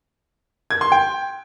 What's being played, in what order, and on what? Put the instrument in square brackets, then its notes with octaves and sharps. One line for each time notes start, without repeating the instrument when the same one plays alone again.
[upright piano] G#6
C6
G5